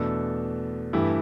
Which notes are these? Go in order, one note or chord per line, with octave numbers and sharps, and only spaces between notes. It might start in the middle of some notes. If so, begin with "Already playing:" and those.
Already playing: E2 B2 A3 D4 A4
G2 E3 A3 E4 G4